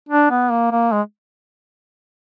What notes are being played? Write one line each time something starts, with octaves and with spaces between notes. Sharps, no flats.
D4
B3
A#3
A#3
G#3